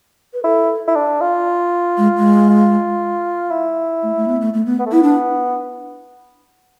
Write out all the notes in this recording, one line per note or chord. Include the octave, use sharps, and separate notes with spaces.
B4
E4 A4
E4
D4
F4
G#3
G#3
F4
E4
A3
A3
B3
A3
A3
B3
B3
A3
B3 E4
D4